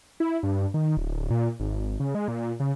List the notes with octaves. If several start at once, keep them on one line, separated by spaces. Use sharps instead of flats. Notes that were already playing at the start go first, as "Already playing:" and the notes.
E4
G2
D#3
D1
A#2
G#1
C#3
G#3
A#2
C#3